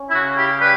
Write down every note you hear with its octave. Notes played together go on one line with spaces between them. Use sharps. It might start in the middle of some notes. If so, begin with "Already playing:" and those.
Already playing: C#4
E4
C#3 F#4
E4 G4
G3 G4 B4